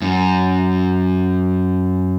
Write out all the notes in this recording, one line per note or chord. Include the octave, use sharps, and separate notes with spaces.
F#2